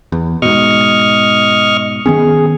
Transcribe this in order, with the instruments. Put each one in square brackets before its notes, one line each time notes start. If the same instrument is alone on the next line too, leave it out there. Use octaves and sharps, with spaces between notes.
[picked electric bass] E2
[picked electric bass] G#2 B2 [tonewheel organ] D#5 C#6 F6
[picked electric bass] D#3 B3 C#4 [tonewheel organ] G#4